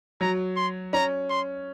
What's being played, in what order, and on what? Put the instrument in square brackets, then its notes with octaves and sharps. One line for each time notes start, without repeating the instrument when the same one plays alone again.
[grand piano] F#3 [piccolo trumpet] A#5
[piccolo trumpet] C6
[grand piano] C#4 [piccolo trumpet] A#5
[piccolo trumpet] C6